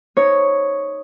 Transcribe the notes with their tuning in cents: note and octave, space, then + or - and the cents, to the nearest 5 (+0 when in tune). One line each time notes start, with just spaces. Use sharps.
D#4 +0 C#5 +0